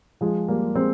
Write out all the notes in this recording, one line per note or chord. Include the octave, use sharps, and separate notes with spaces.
F3 G#3
G3 A#3
G#3 C4